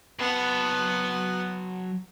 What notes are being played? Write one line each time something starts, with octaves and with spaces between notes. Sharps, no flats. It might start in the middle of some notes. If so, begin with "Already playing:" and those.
F#3 B3 F#5 A5